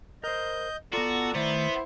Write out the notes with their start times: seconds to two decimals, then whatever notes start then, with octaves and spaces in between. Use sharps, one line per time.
0.24 A#4 C5 D#5 G6
0.93 B3 F4 F#4 A4 D5 A#5
1.35 D#3 A3 B3 E4 C5